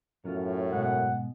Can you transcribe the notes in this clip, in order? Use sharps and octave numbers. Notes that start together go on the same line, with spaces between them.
F#2 A2 F#3 C#4 F4
G#2 B2 F#5